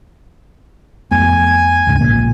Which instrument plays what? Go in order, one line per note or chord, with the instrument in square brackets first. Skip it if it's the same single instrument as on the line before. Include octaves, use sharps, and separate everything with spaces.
[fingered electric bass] F2 A3 B3 [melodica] G#5
[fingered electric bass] D2 G#2 C#3
A#1 A#2 A#3